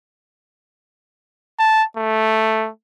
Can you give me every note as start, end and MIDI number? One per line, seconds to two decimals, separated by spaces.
1.59 1.83 81
1.97 2.69 57